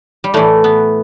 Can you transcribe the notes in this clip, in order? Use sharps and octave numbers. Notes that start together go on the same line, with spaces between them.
G3
A2 E3 A3
B3